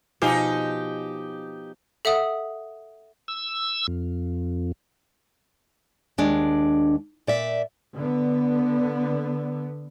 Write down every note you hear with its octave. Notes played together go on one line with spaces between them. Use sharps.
B2 F3 D#4 G4 F5 G#5
A4 E5 F#5 D#6
E6
F2
D#2 G#3 D4
A#2 D5 E5
D3 B3